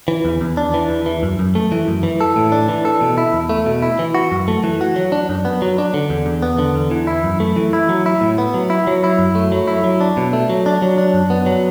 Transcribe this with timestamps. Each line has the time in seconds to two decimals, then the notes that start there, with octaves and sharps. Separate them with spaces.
0.08 E3
0.25 E2
0.41 E2
0.57 D4
0.74 E3
0.89 E2
1.06 E3
1.23 F#2
1.39 F#2
1.55 A3
1.72 E3
1.88 F#2
2.03 E3
2.21 A4
2.36 A2
2.52 D4
2.68 E3
2.85 A4
3.01 B2
3.18 E4
3.33 E2
3.49 A3
3.66 B2
3.83 E4
3.99 E3
4.15 F#4
4.32 F#2
4.48 A3
4.64 E3
4.81 F#4
4.96 F#3
5.12 D4
5.29 F#2
5.45 B3
5.62 F#3
5.78 D4
5.94 D3
6.10 E2
6.26 E2
6.42 B3
6.59 D3
6.75 E2
6.91 E3
7.07 E4
7.24 F#2
7.40 A3
7.56 E3
7.73 E4
7.89 F#3
8.06 E4
8.21 A2
8.38 B3
8.54 F#3
8.70 E4
8.87 F#3
9.04 E4
9.19 F#2
9.35 A3
9.52 F#3
9.67 E4
9.84 F#3
10.01 D4
10.17 B2
10.33 A3
10.50 F#3
10.66 D4
10.82 F#3
10.98 D4
11.14 F#2
11.30 B3
11.46 F#3